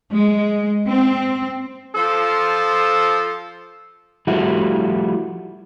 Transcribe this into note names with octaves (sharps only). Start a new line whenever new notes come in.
G#3
C4
F3 A4 C5
F3 G3 A3 E4 F#4